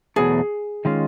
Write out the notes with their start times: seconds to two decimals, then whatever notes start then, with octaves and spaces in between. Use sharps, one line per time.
0.16 E2 B2 F#3 A3 G#4
0.85 D#3 G#3 C#4 F4